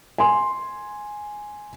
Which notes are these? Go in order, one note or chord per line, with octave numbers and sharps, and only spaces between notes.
G#5 C6